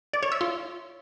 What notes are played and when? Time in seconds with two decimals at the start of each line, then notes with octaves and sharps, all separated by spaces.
0.13 D5
0.23 C#5
0.32 E5
0.41 F4